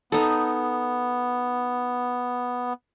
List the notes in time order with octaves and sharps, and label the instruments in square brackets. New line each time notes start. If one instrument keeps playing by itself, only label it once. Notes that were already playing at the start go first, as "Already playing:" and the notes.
[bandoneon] B3 [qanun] D#4 A4